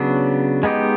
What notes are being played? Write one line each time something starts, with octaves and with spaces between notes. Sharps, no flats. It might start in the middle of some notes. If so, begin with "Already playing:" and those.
Already playing: C#3 F#3 B3 D4
G#3 B3 D#4 G4